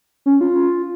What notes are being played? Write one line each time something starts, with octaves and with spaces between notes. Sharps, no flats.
C#4
F4